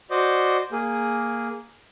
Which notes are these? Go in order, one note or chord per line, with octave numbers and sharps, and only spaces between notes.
F#4 C5 D5 D#5
A#3 G#4